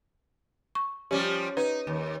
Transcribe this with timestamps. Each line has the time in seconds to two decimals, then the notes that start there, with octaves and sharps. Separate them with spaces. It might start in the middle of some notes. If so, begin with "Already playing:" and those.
0.75 C#6
1.11 F3 G3 C#4 G4
1.57 D#4 B4
1.87 D#2